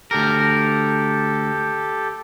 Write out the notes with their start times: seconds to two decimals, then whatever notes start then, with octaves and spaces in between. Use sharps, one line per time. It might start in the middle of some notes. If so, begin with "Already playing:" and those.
0.11 D2 G4 A4 A#4